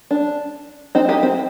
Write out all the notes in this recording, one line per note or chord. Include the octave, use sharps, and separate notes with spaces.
D4
C4 D#4
D#4 G4
C4